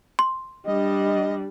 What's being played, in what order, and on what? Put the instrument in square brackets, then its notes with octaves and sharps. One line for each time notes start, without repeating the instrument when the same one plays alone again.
[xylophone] C6
[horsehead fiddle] G3 D4 [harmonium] D#5